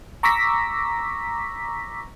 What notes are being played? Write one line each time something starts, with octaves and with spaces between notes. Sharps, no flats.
A#5 C#6 D6 E6 A#6 B6